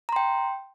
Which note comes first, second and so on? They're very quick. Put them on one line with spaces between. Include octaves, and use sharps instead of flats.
A#5 C6 G5